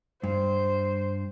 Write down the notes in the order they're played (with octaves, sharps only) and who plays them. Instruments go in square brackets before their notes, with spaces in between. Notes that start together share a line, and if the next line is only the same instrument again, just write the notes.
[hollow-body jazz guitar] G2 [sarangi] C5